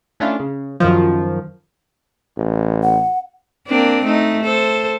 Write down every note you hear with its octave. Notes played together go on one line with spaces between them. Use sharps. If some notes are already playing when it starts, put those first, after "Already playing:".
A3 C#4 D4 E4 F4
C#3
F#2 D#3 F3
A1
F#5
A#3 C4 D4
A3 D#4
A4 C5